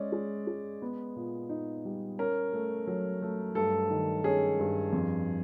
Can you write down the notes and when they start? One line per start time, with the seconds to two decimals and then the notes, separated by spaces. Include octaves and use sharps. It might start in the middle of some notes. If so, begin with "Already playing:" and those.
Already playing: G#3 C#4 D5
0.12 G#3
0.47 G#3
0.82 B3
1.16 A#2
1.49 D#4
1.85 G3
2.19 C#4 A#4
2.53 A3
2.87 F#3
3.22 A3
3.55 G2 A4
3.90 D#3
4.24 C#4 G#4
4.59 G2
4.93 F2